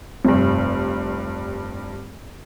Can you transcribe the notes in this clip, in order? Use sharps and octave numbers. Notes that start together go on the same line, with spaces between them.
F1 G2